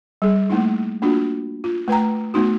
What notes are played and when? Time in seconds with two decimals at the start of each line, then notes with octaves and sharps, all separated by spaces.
0.22 G3 G#4
0.50 A3 A#3 D#4 E4
1.02 A#3 D4 F4 F#4
1.64 F4
1.88 A3 B4 G5 A#5
2.34 A3 B3 D#4 F#4